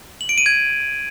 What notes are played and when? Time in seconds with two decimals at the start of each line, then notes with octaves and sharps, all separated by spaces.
0.21 F#7
0.29 D7
0.38 D#7
0.46 G#6